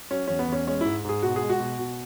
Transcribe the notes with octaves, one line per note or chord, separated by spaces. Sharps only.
F#3 C#4
E2 C#4
B3
E2 C#4
G#3 C#4
G#2 E4
G#2 G#4
B2 F#4
G#4
G#3
F#4
B2
B2